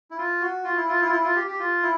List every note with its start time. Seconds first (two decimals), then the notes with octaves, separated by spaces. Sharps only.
0.11 E4
0.18 F4
0.41 F#4
0.64 F4
0.77 E4
0.89 F4
1.01 E4
1.06 F4
1.12 E4
1.24 F4
1.36 G4
1.47 G4
1.60 F4
1.82 E4